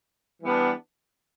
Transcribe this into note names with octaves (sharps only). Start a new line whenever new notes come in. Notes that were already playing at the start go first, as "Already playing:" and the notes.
E3 G3 B3 D4